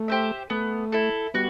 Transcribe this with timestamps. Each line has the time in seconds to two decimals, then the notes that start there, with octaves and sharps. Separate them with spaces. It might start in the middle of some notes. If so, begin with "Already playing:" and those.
Already playing: A3
0.08 G4 C5 E5
0.50 A3 B3
0.92 E4 A4
1.34 G3 B3 F#4